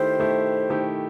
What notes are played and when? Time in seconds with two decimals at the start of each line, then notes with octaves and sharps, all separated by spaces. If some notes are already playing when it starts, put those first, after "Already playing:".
Already playing: D#3 A3 E4 G4 C5
0.19 D#3 A3 E4 G4
0.70 D#3 A3 E4 G4